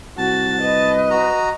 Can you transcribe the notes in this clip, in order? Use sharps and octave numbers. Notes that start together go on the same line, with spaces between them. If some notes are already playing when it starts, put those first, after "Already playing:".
C2 F#4 A5
B4 D#5
F#4 A#5